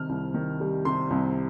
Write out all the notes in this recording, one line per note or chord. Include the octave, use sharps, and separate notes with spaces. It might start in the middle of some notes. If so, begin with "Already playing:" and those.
Already playing: C3 D#3 G3 F6
C2
D#3
G3
C3 C6
C2